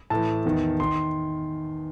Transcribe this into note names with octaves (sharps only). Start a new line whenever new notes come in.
A2 E3 A5
E2 D#3
D#3 C6